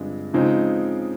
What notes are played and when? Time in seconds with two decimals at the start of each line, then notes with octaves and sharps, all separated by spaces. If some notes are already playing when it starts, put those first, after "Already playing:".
Already playing: G2 D3 F3 G#3 C4
0.33 C#3 F3 G#3 C4 D#4